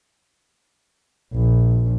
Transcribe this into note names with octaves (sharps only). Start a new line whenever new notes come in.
A#1